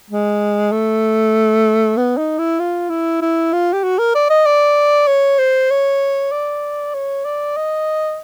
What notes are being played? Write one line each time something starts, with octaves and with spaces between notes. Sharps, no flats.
G#3
A3
B3
D#4
E4
F4
E4
E4
F4
G4
F#4
A#4
D5
D#5
D5
C#5
C5
C#5
D5
C#5
D5
D#5